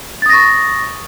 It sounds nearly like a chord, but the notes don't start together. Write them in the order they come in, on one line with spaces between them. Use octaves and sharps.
A6 D#6 A#6 C#6